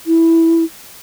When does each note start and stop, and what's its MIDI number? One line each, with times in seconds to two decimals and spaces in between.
0.07 0.64 64